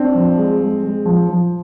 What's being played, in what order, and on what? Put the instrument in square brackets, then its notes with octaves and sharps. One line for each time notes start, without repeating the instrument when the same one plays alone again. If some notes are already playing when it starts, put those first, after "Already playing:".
Already playing: [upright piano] C4 [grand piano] D4
[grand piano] F3
G#3
G#3
G#3
F3
F3